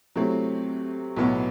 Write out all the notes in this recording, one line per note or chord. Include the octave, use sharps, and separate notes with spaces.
C3 F#3 A3 C4 E4
B1 A2 F#3 B3 E4